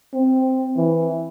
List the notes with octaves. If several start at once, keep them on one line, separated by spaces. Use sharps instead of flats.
C4
E3